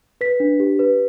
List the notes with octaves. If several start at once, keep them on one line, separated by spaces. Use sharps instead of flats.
B4 B6
D4
G4
B4